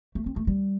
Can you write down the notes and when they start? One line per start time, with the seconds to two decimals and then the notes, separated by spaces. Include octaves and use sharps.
0.15 A3
0.26 C4
0.36 A3
0.47 G3